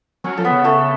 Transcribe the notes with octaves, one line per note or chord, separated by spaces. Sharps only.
F#3 C#4 C#5
F3 A4
B3 B4
C#3
A3 A4